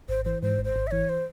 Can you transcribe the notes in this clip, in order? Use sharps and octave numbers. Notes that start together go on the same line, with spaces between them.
G#1 C5
E3 C5
G#2 C5
G#1
C5
G#1
E5
E3 C#5
C5